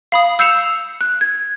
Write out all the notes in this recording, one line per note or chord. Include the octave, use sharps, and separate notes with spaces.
F5 B5 D#6
E6 G6 C7 C#7 E7 F7
F#6
G#6